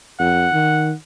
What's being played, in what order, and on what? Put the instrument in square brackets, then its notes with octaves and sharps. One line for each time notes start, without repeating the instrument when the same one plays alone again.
[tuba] F2 [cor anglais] F#5
[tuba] D#3